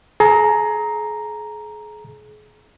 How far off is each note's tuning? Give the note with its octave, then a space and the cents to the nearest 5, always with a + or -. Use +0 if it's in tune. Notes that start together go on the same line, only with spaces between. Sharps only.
G#4 +35 A#5 +0